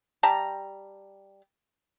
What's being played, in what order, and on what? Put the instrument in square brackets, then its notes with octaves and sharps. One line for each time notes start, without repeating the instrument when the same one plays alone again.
[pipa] G3 G4 A5 A#5